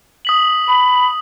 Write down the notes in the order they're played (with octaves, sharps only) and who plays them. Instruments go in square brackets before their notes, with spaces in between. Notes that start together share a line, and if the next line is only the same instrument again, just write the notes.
[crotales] D#6 B6 F#7
[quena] B5